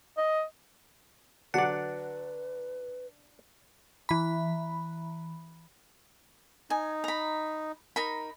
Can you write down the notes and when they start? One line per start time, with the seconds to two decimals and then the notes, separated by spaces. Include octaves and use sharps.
0.17 D#5
1.54 D3 F#3 D4 B4 D5 F#5
4.09 E3 B5
6.70 D#4 G#5
7.04 A#5 B5
7.96 D#4 A#4 B5